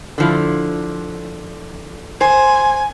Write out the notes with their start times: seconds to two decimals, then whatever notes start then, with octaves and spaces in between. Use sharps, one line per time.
0.18 D3 F3 E4
2.21 C5 G#5